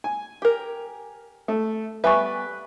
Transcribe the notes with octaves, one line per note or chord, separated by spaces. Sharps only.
G#5
G4 A#4
A3
G3 B3 B4 E5 G#5 C#6